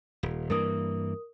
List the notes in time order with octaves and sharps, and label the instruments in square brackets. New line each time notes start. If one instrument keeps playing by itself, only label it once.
[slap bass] D#1
[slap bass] G2 E3 A#3 [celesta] A#4 D#6